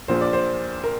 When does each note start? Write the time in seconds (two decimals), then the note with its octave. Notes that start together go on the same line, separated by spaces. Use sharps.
0.08 A#1 A#2 C5
0.21 D5
0.33 C5
0.84 A#4